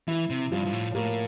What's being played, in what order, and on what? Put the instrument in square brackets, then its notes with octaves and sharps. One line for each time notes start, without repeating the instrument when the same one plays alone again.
[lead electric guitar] E3 [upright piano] E4
[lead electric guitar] C3
[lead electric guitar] G2 [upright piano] F3
[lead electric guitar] G2
A2
[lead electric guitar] A2 [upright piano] A#3